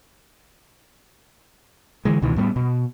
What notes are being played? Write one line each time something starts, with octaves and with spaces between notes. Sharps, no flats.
D3 E3 G#3
C#2 B2 D#3 E3
A2 G3 A3 B3
B2